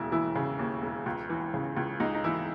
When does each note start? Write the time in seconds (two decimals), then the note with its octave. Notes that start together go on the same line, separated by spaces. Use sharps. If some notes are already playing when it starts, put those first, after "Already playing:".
Already playing: E1 D#2 C#3 E4
0.12 E3 E4
0.35 C#3
0.59 D#2
0.82 E1
1.06 C#2
1.30 E3
1.54 C#3
1.77 C#2
2.00 C#2 D#4
2.15 D#4
2.24 E3 E4